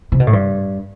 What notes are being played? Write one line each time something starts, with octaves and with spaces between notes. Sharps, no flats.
C3
B2
A2
G2